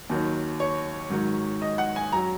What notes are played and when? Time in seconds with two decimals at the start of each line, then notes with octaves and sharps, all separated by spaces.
0.09 D#2 D#3 F#3
0.60 C#5
1.10 G#2 D#3 F#3
1.62 D#5
1.78 F#5
1.96 G#5
2.12 F#2 F#3 A#5